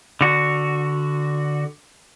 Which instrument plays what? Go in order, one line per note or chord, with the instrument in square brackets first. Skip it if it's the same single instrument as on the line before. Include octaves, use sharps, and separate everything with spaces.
[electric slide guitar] D3 F#4